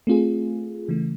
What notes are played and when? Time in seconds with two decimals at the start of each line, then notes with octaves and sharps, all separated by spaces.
0.07 A3 C4 F4 G#4
0.88 C#3 E3 A3